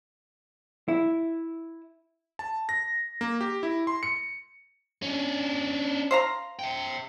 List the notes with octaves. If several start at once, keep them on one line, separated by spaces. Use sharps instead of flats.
E4
A5
A#6
A#3
G4
E4
C6
C#7
C#4 D4
C5 F5 A#5
E5 G5